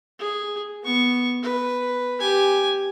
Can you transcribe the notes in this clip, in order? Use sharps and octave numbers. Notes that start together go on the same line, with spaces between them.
G#4
B3 C#6
B4
G4 G#5